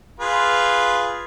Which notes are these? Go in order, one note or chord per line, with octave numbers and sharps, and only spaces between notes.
F4 G#4 B4